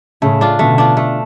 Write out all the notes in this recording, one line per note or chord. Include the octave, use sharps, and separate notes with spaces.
A2 C#3 A3
D4 F4
B2 D3 A3
D4 F4
A3